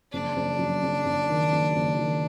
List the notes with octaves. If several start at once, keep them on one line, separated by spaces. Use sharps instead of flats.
F#1 D4
F#1
F#2
F#1
F#1
D#3
F#1
F#1
D#3